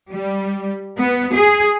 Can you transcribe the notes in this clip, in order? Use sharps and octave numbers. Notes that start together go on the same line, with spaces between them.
G3
B3
G#4